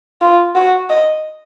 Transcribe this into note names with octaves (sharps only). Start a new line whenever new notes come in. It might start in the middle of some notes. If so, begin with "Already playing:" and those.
F4
F#4
D#5